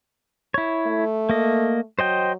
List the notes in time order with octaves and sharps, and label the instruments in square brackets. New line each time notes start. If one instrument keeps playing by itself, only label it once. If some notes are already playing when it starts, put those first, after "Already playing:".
[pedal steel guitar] E4 C#5
[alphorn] A3
[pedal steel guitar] A#3 D#5
[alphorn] F#3 [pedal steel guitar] C5 D#5 G5